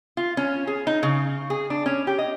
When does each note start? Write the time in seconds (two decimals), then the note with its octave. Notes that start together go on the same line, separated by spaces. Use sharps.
0.17 F4
0.37 C#4
0.67 G#4
0.87 D#4
1.03 C#3
1.50 G#4
1.70 D4
1.86 C#4
2.07 G4
2.18 D#5